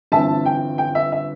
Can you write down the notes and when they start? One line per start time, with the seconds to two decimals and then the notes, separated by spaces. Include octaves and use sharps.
0.12 G1 G2 E3 C4 E5 A5
0.46 G5
0.78 G5
0.95 E5
1.12 E5